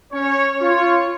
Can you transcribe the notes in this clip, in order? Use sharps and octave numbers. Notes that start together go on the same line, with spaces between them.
C#4 C#5
F4 C#5